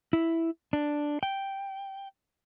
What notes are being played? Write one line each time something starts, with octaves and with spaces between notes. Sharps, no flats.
E4
D4
G5